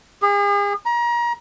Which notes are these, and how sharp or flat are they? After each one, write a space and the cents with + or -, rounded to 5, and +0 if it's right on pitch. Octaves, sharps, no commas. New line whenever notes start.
G#4 -40
A#5 +30